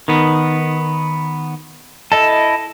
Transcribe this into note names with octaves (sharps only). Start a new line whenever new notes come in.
D#3 B3
E4 A4 D#5 A5